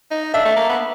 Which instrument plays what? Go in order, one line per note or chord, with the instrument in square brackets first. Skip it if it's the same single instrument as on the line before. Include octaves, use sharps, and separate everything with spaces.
[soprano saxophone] D#4
[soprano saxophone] D4 [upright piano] E5
[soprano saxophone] A3
A#3
B3